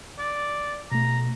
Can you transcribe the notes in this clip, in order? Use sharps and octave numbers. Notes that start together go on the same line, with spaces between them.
D5
B2 A3 A#5